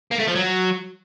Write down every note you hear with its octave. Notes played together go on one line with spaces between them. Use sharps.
A#3
A3
F3
F#3